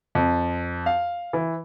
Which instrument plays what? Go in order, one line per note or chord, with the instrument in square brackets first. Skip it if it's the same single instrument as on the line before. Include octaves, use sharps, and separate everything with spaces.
[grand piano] F2
F5
E3